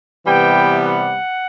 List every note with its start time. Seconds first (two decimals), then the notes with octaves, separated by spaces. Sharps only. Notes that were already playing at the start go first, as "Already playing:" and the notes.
0.26 C3 E3 G3 B3 G5
0.82 F#5